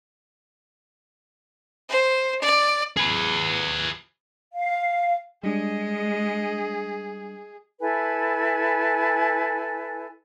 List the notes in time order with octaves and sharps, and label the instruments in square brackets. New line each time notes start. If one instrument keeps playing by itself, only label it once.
[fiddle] C5
D5
[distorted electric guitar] G#4 B4
[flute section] F5
[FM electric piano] G3 D4 [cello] G#3 [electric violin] G#4 [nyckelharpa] D#5
[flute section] E4 A4 B4 G#5